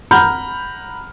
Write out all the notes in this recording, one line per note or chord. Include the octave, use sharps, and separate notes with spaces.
F#5 A#5 B5 F6 G6